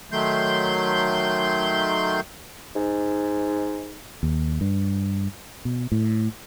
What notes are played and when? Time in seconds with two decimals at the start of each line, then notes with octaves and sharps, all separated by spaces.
0.12 D#3 F#3 A3 C6 G6
2.76 G#2
4.23 D#2
4.61 G2
5.65 B2
5.92 A2